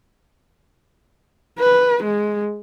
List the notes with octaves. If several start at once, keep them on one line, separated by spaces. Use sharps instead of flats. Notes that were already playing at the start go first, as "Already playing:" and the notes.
B4
G#3